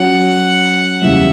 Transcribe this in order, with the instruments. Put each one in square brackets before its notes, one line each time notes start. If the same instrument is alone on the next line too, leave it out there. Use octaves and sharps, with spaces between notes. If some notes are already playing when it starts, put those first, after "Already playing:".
Already playing: [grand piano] F#3 C#4 F#4 [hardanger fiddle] F#5
[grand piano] E2 C#3 E3 G3 [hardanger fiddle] E5